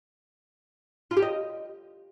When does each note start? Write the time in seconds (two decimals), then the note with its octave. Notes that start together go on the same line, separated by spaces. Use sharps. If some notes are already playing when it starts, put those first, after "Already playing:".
1.11 F4
1.17 G4
1.22 D#5